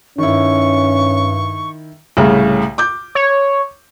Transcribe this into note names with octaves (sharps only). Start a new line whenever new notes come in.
G2 D#3 C#4 E4 C#6
C2 A2 C#3
D6 G6
C#5